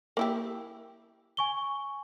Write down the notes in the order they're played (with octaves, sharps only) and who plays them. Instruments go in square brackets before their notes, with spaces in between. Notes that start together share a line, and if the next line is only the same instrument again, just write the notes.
[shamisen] A#3 E4 G4
[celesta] G#5 C#6 G7